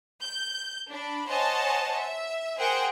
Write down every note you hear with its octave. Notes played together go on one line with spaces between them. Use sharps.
G6
D4 B5
C5 C#5 D#5 F#5 G#5 A5
E5
G#4 A#4 C5 F#5 G5